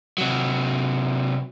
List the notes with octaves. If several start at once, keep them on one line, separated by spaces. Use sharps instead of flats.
C3 F#3